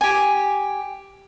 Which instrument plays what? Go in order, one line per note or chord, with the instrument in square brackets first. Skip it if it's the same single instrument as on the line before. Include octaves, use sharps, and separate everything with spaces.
[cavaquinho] G4 G#5